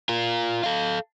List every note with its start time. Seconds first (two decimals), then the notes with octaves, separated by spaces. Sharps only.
0.09 F4 A#4
0.64 A4 F5